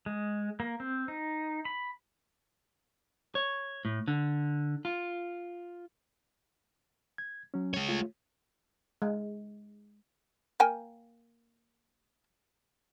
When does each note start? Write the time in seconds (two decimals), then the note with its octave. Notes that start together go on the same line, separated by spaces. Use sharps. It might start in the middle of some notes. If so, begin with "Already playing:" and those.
0.06 G#3
0.60 A#3
0.80 C4
1.08 D#4
1.65 B5
3.35 C#5
3.85 A2
4.08 D3
4.85 F4
7.18 G#6
7.54 F#3 C#4
7.74 G#3 C#5
7.89 A3 F4
9.02 G#3
10.60 A#3 G5 G#5